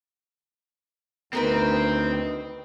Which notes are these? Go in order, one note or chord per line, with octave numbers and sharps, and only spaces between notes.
D2 D#3 B3 C4 A#4 B4